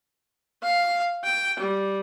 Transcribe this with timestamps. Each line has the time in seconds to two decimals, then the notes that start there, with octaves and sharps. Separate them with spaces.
0.63 F5
1.24 G5
1.60 G3